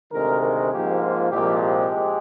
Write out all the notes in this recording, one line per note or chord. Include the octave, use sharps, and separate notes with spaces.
D2 C3 D#3 G#3 A#4
A#4
G#2 F3 A#3 G4
F4
C2 A#2 F3 G#3 G4
G4
G#3